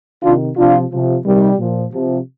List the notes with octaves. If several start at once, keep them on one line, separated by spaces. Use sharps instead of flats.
C3 D#3 D4 F4
C3 F3 D4 F4
C3 F3
C3 D#3 G3
A#2 F3
C3 F3